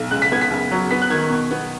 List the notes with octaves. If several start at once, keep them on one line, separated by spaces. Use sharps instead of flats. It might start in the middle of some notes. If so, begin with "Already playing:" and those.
Already playing: B1
C#2 F#6
B6
B3 G#6
B6
F#1
F#3
B3 B6
F#6
D#3 G#6
B2
B3